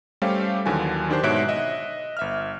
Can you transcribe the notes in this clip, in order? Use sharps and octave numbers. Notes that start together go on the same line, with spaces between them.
G3 A3 C#4 G4 C5 F5
D#2 D3 E3 F#3 G#5
D#3 D4 G4 C5
G#2 B2 C#5 E5 F#6 D7
D#5 E5
G1 E5 F6